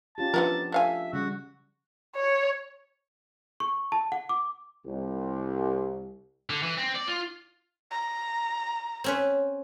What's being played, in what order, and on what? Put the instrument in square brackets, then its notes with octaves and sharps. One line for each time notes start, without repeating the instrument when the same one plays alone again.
[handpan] C#4 F4 G4 [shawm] A5
[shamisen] E3 B3 A#4 [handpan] F3 D4
[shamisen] A3 F5 G#5 [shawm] E5
[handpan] C#3 G3 [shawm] F#4
[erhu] C#5
[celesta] C#6
A5
F#5
D6
[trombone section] C2
[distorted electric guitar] D3
E3
C4
D5
F4
[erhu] A#5
[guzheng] C4 C#4 B4